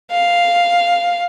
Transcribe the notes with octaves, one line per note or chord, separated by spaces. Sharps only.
F5